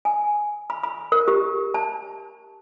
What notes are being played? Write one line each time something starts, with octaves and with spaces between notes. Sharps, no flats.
G#5
B5
B5
A#4
G4
A5